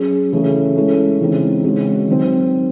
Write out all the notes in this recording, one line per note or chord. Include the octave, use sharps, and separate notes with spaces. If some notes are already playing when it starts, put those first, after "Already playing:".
Already playing: F#3 C#4 G#4
C#3 E3 A3 C#4 G#4
G#3 C#4 E4 A4
C#3 E3 G#3 C4 D#4
C#3 G#3 C4 F#4
D#3 F#3 C4